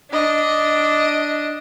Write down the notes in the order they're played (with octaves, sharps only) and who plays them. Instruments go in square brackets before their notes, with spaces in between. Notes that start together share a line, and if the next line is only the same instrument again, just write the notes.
[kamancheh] D4 D#5